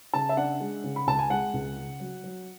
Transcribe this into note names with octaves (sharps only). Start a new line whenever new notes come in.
C#3 A5
E5
D4 F#5
G#3
C#3
B5
C#2 A5
G#5
G#3 F#5
C#2
C#3
F#3
F#3